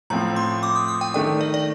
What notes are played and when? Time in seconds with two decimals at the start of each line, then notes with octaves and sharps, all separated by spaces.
0.10 A2 F3 C4 A#5
0.36 C6
0.63 D6
0.76 D#6
0.88 D#6
1.01 G5
1.14 D#3 A3 D4 G5
1.41 D5
1.54 D5